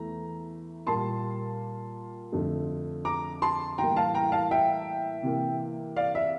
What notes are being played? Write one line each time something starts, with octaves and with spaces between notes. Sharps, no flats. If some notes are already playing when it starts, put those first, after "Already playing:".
Already playing: E2 E3 A3 A#5
A#2 G3 A#3 A5 C6
F2 D3 A3
A#5 D6
A5 C6
A2 E3 G3 A#3 G5 A#5
F5 A5
G5 A#5
F5 A5
E5 G5
C3 E3 A#3
D5 F5
E5